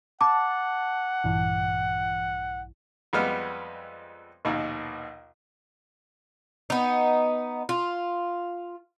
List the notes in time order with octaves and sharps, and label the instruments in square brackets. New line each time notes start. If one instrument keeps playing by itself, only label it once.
[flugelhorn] F#5 [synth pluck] A5 [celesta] D6
[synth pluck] A#1 G2 E3
[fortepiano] F2 G3 G#3 B3 F6
A#1 D#2 B2
[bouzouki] B3 D#4
F4